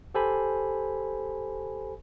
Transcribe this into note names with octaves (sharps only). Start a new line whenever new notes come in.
G4 A4 C5 G#5 B5